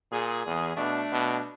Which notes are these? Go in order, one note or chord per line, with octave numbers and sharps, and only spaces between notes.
A#2 G#4
E2
B2 A3 D4
B2